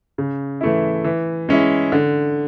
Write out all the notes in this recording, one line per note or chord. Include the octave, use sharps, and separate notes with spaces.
C#3
E3 A3 E4
E3
G#3 C#4 E4
D3